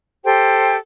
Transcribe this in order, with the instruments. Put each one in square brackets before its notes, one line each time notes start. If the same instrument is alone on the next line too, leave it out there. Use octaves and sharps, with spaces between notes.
[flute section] G4 A4 C5 G5